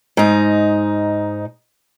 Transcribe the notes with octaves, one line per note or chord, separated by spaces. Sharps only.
G#2 D#4